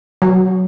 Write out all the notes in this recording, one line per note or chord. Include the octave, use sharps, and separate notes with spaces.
F#3